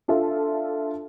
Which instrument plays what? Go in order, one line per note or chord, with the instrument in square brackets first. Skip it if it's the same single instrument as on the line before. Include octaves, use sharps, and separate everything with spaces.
[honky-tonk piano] D4 F4 A4 E5